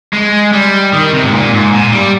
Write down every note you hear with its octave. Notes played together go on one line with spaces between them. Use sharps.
G#3
G3
D#3
C3
G#2
A#2
G#2
A#2
G3